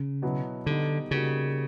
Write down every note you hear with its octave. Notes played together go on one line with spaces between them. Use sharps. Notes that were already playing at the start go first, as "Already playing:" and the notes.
Already playing: C#3
B2 F#3 B3 E4
D3 G3 B3 D#4
C#3 G3 A#3 D#4 F#4